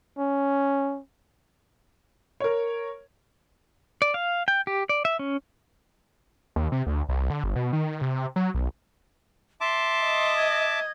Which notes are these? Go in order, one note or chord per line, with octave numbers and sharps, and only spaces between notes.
C#4
A#4 C#5
D5
F5
G5
G4
D5
E5
C#4
D#2
C3
D2
C2
D3
G1
B2
D#3
C3
F#3
B1
E5 A5 C6 D6
D#5
G#6